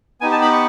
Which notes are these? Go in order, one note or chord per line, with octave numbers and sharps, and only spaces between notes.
B3 D#4 G4 G#5
A5
B5
C#6